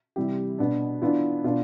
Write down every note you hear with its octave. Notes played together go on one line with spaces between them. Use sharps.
C3 E3 G3 G4
B2 B3 D4
E3 B3 D4 F4
B2 B3 D4 F4